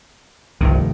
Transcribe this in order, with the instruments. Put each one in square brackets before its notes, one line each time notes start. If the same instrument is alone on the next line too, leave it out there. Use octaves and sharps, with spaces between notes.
[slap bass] F1 G2 D#3 [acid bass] C2